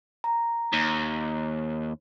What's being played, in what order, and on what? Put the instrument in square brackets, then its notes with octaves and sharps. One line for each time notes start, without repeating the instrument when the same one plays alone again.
[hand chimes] A#5
[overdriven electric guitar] D#2